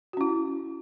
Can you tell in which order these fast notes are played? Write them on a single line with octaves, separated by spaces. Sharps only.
F#4 C#4 E4